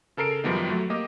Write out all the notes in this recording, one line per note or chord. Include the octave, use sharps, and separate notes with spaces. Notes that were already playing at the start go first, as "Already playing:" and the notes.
C#3 A4 A#4 C7 D7
F#2 D#3 F3 G3 B3 D#4
F#3 A3
A#3 G4 D#5